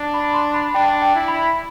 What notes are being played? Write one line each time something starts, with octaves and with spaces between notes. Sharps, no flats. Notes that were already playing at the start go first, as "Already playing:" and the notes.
Already playing: D4
B5
C6
B5
D4 G5
G5
E4
B5